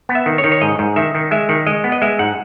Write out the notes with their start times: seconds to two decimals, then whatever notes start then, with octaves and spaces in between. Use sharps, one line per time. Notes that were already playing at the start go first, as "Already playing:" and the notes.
0.09 B3
0.15 E5
0.26 D#3
0.38 C#5
0.44 D#3
0.52 C#5
0.61 G#2 D#5
0.79 G#2
0.96 D#3 E5
1.15 D#3
1.31 G#3 E5
1.49 D#3
1.67 G#3 D#5
1.84 B3
1.92 D#5
2.02 G#3 E5
2.19 G#2 F#5